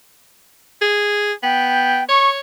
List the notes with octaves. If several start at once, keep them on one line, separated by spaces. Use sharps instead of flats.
G#4
B3 G5
C#5 C#6